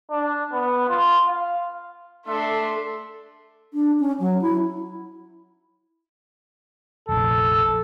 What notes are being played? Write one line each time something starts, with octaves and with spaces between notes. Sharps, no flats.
D4
B3
F4
F5
A3 D4 A4 E5 C6
D4
C#4
F#3
E4
F1 A#1 A4